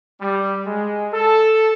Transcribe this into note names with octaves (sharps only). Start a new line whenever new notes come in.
G3
G#3
A4